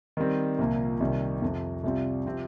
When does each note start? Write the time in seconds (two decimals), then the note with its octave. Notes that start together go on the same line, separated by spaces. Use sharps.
0.17 D#3 G3 C4
0.59 C2 A#2 F3 A#3 F4
1.00 C2 C3 D#3 G3
1.42 F2 C3 F3
1.84 C2 C3 G3 C4 F4
2.26 C3 F3 C4 G4